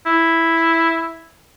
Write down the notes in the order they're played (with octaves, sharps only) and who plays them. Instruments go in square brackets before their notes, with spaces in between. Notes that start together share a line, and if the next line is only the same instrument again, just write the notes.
[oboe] E4